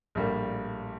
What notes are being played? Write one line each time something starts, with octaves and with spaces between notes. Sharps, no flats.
A#1 A2 G3 A#3